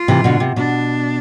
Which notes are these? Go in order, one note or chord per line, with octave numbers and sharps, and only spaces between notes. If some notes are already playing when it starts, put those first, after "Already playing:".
Already playing: F4
C3 E3
B2 D3
C3
B2 D4